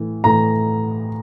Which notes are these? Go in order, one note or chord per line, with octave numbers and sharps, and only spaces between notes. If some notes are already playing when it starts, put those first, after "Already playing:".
Already playing: A2 E3
A2 E3 A#5